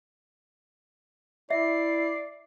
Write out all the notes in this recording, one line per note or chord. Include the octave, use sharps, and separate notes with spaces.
E4 D5 E5 C7